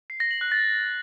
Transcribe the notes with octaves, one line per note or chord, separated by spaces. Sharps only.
C7
A#6
F#7
F#6
A6